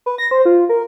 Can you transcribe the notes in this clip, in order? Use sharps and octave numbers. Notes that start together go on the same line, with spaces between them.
B4
A#6
C5
F4
A#4